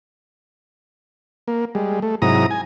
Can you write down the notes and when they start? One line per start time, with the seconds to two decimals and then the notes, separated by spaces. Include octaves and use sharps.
1.48 A#3
1.75 G3 G#3
2.02 A3
2.22 G#2 C3 F#3 E4 A#5 D#6
2.51 G#5